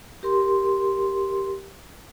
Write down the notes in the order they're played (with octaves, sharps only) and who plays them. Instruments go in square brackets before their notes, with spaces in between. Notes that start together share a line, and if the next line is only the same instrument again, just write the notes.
[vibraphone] G4 A#4 C6